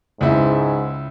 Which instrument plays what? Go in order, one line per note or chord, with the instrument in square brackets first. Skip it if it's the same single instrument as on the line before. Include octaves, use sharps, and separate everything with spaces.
[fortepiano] C#2 E4 [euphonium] G#2